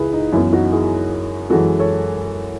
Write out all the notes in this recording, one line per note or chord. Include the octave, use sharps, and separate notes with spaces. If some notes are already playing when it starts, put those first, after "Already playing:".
Already playing: C#2 C#3 E4 G#4 B4
D#4
F#2 E3 B3 E4
D#4 F#4
E4 G#4
F#2 E3 G#3 F#4 A4
A4 C#5